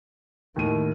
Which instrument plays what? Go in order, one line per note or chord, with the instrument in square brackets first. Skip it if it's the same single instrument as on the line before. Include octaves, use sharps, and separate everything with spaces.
[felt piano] D#2 A2 D#7 [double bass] D#3